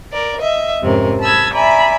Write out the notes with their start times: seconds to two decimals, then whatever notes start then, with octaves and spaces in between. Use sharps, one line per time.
0.10 A#4 D5
0.40 D#5 E5
0.81 F2 G#2 C3 C#4 A#4
1.21 A5 B5 D#6 E6 G#6
1.53 D5 E5 G#5 A#5 B5